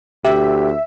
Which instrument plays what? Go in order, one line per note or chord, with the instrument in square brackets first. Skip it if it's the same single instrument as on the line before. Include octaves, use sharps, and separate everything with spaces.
[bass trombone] D2 [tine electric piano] G4 [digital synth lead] E5